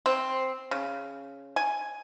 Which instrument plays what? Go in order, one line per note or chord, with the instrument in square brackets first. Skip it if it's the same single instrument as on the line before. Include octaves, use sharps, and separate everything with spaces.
[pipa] C4
C#3
G#5